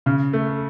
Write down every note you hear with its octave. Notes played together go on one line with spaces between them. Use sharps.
C#3
A3